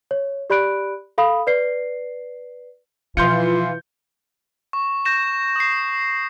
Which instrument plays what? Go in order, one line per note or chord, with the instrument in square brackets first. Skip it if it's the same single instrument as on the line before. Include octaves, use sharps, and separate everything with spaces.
[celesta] C#5
G4 D5 B5 F#6 D7
A4 F5 B5 D#6
B4 D5 C7
[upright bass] B2 F3 [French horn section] E3 [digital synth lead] F4 [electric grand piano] C6 G6 C#7
[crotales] C#6
G6 A#6 E7
D#6 C7